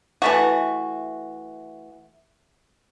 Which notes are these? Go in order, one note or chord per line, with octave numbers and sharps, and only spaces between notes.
E3 A3 F#4